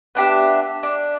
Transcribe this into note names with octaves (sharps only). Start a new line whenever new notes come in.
B3 D4 G4 E5
D4